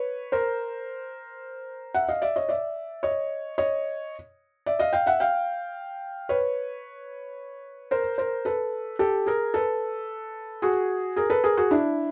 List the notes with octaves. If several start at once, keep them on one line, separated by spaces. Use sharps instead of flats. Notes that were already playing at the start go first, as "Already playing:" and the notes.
Already playing: B4 C#5
A#4 C5
E5 F#5
D#5 F5
D5 E5
C#5 D#5
D5 E5
C#5 D#5
C#5 D#5
D5 E5
D#5 F5
F5 G5
E5 F#5
F5 G5
B4 C#5
A#4 C5
A#4 C5
A4 B4
G4 A4
G#4 A#4
A4 B4
F#4 G#4
G#4 A#4
A4 B4
G#4 A#4
F#4 G#4
D4 E4